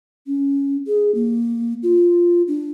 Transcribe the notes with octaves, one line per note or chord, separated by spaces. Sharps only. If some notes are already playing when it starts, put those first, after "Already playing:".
C#4
G#4
A#3
F4
D4